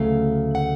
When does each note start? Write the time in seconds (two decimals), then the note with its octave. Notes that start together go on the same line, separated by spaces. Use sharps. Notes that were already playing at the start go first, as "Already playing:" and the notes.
Already playing: D2 C#3 F#3 A3 F5
0.55 F#5